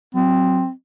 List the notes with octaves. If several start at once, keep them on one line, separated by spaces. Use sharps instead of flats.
F#3 C4